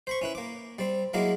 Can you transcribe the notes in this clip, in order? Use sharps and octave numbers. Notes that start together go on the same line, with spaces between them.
C5 B5 C#6
C#4 E4 B4
A#3 D6
G3 C4
F#3 G#3 A#3 E4 F5 D6